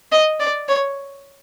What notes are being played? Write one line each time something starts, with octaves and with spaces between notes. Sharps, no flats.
D#5
D5
C#5